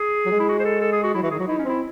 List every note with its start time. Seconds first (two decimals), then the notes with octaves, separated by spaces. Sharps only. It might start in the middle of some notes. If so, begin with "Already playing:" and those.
Already playing: G#4
0.25 F#3
0.31 G#3
0.40 E4
0.49 F#4
0.60 C5
0.65 A4
0.81 A4
0.92 G#4
1.04 F#4
1.14 F#3 E4
1.23 E3 F#4
1.31 D#3 G#4
1.39 F#3 F#4
1.47 D#4 E4
1.58 C#4
1.65 C4 E4